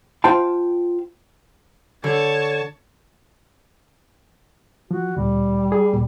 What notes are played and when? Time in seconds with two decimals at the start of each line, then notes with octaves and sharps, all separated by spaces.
0.24 F4 C5 F5 G5 A5
2.04 D3 C#5 A5
4.91 F3 F#4
5.17 D2 A#2 G3
5.72 G#4
5.93 D2 A#2